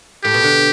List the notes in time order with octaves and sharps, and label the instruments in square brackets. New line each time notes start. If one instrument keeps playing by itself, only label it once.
[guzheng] A2 [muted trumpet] G4
[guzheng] B2
D3